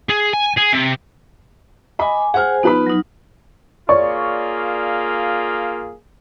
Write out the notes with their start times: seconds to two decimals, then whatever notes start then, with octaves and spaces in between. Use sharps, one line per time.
0.10 G#4
0.33 G#5
0.57 G#4
0.73 C3
1.99 D#5 G#5 B5 D6
2.34 G#4 C5 F#5 G#5 F6
2.63 F3 B3 D#4 B4 B5
2.86 F#3 D#4
3.89 A#3 F4 G#4 C#5 D5 C#6